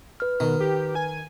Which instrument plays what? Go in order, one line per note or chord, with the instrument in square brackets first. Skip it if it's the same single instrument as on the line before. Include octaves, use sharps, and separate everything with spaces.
[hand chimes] B4 F6
[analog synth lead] B2 [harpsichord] D#3
[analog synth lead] G4
G#5